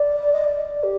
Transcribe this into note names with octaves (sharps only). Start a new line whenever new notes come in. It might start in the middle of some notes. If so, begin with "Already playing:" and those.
Already playing: D5
D#5
D5
G4